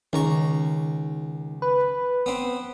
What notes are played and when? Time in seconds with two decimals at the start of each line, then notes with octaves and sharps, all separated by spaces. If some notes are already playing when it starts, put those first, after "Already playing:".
0.13 C#2 D#3 A#5 C#6
1.62 B4
2.26 B3 C4